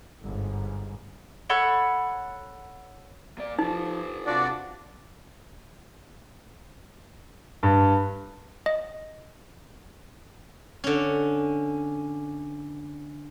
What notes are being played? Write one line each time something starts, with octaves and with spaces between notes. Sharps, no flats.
G1 G#2
A4 C#5 F#5 B5
A#3 D5
F3 D#4 G4 A4
C3 D4 F4 F#4 D5 F#5
G2
D#5
D3 C#4